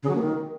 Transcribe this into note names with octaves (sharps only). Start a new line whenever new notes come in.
C#3
F#3
A#3
D#3